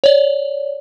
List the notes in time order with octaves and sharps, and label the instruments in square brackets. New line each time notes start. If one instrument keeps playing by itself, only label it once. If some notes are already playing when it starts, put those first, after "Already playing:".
[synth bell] C#5 D5